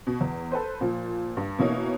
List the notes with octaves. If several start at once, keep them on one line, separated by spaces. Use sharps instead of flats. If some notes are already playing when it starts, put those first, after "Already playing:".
B2
E2
A4 B4 C5
A#2 F3
G2
B2 E3 A#3 C#4 D#4